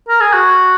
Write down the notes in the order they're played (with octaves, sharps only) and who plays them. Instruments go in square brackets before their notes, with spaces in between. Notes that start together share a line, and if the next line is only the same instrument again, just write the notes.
[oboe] A#4
G#4
F#4